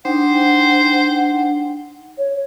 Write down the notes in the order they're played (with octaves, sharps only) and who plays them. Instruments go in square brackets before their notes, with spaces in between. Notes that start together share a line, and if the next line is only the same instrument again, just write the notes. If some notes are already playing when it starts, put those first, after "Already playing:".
[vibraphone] D4 D#4 G5 [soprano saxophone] C5 [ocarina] F#5
[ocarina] C#5